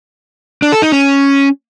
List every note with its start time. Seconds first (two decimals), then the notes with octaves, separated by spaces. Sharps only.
0.62 D4
0.72 A4
0.82 D#4
0.92 C#4